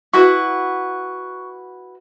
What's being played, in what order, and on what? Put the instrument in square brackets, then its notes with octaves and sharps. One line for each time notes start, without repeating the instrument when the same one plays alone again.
[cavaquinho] E4 F#4 B4 [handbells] C#6